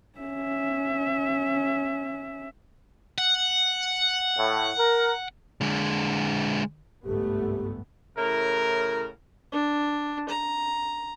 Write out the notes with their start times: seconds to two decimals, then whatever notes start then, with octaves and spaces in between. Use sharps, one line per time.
0.19 C#4 E5
3.18 F#5
4.38 A2
4.78 A#4
5.61 D3 G#3
7.05 G1 C2 G#2 A3 B3 G4
8.18 A2 C#3 E4 A#4
9.52 D4
10.29 A#5